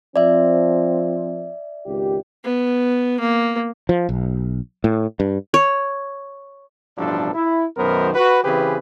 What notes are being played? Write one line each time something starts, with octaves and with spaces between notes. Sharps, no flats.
F3 C4 D5 E5
G#1 C#2 G4
B3
A#3
F3
B1
A2
G2
C#5
A1 G2 B2 F3 D4 A4
E4
B1 F#2 D#3 B3 A#4 C5
F#4 B4
C#3 E3 C4 G4 G#4 B4